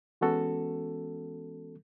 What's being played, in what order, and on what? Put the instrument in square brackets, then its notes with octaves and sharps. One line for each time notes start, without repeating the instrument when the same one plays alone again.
[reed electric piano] E3 G#3 B3 C#4 F#4 A4